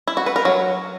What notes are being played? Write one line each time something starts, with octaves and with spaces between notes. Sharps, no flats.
E4
F#4
B4
A#4
F#3